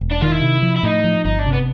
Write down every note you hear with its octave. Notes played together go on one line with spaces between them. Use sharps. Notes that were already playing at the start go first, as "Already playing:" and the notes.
E1
D4
D#3 F4
E4
C3
F3
E4
A2 D#4
F3
G1 D#4
D4
C3
B3